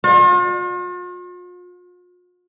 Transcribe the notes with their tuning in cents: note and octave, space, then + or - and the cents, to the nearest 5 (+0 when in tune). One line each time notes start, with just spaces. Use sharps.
F4 +45